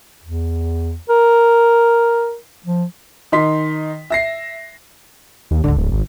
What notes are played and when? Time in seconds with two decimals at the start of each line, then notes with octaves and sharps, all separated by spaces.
0.24 E2
1.09 A#4
2.66 F3
3.32 D#3 D#4 C6 B6
4.10 E5 A#6 C7
5.51 D#2
5.64 D2 G#2 D3
5.77 D1
5.92 G#1